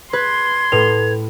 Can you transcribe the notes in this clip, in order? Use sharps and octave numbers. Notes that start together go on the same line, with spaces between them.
B4 C6 G#6
A2 A4 B4 F7